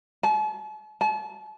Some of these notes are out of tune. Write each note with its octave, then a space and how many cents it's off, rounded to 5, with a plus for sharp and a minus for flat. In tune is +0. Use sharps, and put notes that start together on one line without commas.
A5 -45
A5 -40